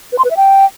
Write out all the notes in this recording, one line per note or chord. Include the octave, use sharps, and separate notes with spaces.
B4
C6
B4
E5
G5